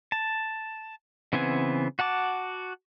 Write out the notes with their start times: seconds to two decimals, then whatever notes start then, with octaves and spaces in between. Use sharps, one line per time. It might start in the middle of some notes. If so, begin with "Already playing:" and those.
0.12 A5
1.33 C#3 E3 B3 C4 G#5
1.99 F#4 F#5 A5 D6